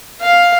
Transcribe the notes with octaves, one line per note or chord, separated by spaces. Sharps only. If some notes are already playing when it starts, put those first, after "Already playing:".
F5